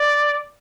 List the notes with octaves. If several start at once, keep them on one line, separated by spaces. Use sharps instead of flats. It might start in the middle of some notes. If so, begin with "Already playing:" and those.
Already playing: D5